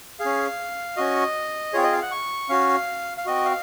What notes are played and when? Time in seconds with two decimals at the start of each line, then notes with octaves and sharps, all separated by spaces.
0.20 G#4 F5
0.25 C#4
0.97 C#4 F#4 D#5
1.73 C4 F4 G#4 C#5
1.83 D#5
1.92 F5
2.02 F#5
2.11 C#6
2.49 C#4 F#4 F5
3.18 F5
3.26 C4 F#4 D#5
3.45 F5